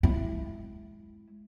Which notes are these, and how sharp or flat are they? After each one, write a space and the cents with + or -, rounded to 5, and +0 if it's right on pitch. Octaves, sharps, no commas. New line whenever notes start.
G#3 +5 E4 +0